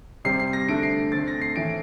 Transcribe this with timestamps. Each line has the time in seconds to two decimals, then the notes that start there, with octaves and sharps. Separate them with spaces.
0.25 C3 G3 C4 C7
0.40 C7
0.53 A#6
0.68 D3 A3 D4 D7
0.83 C7
1.12 D3 A3 C4 A6
1.28 A#6
1.41 C7
1.56 A2 E3 A3 D7